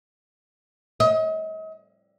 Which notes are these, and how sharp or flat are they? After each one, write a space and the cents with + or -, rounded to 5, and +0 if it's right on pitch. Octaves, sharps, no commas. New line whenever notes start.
D#5 +40